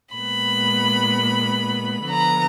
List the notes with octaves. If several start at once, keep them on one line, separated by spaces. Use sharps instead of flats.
A#2 G#3 B3 B5
D3 F3 B3 A#5